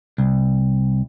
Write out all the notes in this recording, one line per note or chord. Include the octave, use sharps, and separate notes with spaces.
C2